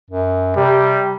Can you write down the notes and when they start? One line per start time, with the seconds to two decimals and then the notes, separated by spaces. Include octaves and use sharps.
0.11 F#2
0.57 C3 G3